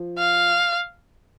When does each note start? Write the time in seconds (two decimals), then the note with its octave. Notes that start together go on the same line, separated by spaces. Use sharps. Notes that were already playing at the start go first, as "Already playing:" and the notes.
Already playing: F3
0.18 F5